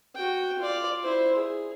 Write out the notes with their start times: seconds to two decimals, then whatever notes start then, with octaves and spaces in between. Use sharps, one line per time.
0.15 F#4 G5
0.59 F4 D5
1.02 E4 C5
1.35 G#4